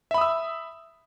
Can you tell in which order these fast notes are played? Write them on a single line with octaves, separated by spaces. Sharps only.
E5 B5 D#6 E6